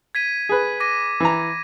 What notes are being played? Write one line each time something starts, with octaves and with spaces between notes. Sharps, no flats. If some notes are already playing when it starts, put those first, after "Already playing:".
G#6 B6 D#7
G#4 B4
D6 A#6 D#7
E3 A#5